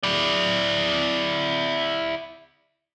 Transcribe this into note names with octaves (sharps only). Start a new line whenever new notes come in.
E4 D5